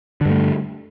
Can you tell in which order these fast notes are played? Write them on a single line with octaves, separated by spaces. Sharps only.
D3 G2 A3